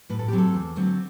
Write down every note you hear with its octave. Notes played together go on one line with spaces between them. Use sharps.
A2 B4
A4
F#3 C4 G4
A4
E2
D3 F#3 A3 C4